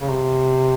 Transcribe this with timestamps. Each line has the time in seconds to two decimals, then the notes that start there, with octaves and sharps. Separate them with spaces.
0.01 C#3
0.10 C3